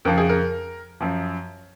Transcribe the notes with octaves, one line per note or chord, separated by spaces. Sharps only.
F2 C#3 F3 A#4
G#4
A#4
F#2 F3